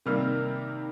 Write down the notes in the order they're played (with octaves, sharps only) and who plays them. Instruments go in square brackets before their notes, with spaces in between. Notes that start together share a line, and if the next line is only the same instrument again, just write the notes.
[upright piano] C3 D#3 G3 A#3 F6